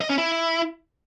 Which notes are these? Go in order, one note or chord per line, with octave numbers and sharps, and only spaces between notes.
D#5
C#4
E4